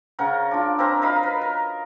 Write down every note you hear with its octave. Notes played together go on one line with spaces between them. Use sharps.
C#3 A#4 F#5
D4 F4
C4 A#4 B4 A#5
A#4 D#5 F5 B5
B4
A#4